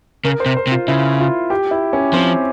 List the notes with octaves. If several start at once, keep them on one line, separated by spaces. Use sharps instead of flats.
C#3 A#4
C5
C3
C5
C3
F4
C#3 E4
F4
G4
E4
C#4
F3 C4